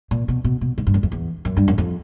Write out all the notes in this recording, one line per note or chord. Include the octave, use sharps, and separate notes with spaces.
A#2
B2
B2
B2
G#2
G2
F#2
F2
E2
F#2
G2
F#2
F2